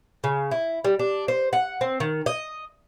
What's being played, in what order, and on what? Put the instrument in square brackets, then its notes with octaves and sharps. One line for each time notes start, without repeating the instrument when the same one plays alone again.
[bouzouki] C#3
E4
G3
D4
C5
F#5
C4
D#3
D#5